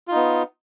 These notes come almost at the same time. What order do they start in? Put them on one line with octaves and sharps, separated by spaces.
F4 D#4 B3